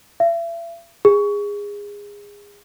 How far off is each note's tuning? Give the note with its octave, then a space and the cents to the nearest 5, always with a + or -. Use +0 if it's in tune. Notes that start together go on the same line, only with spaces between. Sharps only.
E5 +40
G#4 -25